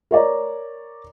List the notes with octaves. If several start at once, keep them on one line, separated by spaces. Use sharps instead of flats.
A#4 C#5 D5 A#5